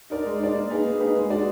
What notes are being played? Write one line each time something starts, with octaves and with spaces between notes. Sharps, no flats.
D#4 A#4 D5
G#3
D#4 A#4 D5
A#3
D#4 G#4 B4
A#3
D#4 G#4 B4
G#3
D#4 F#4 D5